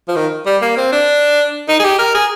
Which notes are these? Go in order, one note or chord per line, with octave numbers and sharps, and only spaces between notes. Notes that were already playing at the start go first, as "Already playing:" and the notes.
F3
D#3
G3
A#3
C4
D4
D#4
G#4
G4
A#4
G#4